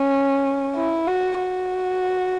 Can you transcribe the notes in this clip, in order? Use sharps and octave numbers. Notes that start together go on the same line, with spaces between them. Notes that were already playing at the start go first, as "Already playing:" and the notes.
Already playing: C#4
E4
F#4
F#4